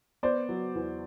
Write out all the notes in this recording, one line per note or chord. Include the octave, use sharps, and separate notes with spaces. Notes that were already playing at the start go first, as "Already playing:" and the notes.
B3 C5 D5
F#3
E2